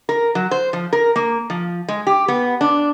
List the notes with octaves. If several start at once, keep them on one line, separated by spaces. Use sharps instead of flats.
A#4
F#3
C5
F3
A#4
A#3
F3
G#3
G4
B3
D4